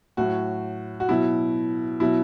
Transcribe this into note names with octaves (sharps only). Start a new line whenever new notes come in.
A2 F#3 F#4
F#4
B2 F#3 E4
B2 F#3 E4